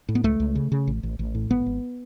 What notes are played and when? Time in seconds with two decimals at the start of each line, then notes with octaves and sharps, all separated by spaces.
0.09 A2
0.15 B3
0.24 C#2 A3
0.40 C#2
0.55 C#3
0.72 C#3
0.87 A1
1.03 A1
1.19 A1
1.35 A2
1.50 G#1 B3
1.66 G#1